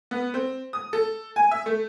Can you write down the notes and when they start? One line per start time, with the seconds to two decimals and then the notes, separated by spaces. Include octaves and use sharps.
0.11 B3
0.34 C4
0.73 D#6
0.93 A4
1.36 G#5
1.51 E5
1.66 A3